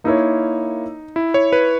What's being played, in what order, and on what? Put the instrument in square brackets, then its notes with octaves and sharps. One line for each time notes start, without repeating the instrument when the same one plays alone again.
[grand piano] A#3 E4 A#4 C#5 [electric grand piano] D#4
[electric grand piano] E4
C#5
B4